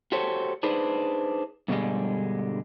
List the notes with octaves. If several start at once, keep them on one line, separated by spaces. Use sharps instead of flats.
F#4 G4 A4 C5 C#5
D4 D#4 G#4 B4 C5
G2 B2 D3 G3 G#3